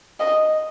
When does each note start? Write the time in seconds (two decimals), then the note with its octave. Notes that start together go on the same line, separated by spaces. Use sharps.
0.20 D#5